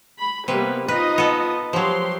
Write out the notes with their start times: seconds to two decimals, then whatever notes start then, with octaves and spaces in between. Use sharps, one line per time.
0.20 B5
0.48 C3 G3 A#3 B3 B4
0.88 D#4 F4 B4 D#5
1.18 B3 A4
1.73 F3 F#3 G4 C6